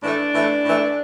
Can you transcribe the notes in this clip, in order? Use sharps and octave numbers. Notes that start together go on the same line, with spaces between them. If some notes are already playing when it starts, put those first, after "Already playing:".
A2 E3 A3 D4
A2 E3 A3
A2 E3 A3